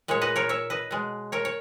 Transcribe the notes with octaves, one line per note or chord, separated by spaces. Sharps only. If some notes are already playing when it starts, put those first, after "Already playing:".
A#2 G#3 C#5
B4 D#5
A#4 C#5
C#5 E5
B4 D#5
B2 G#3
A#4 C#5
C#5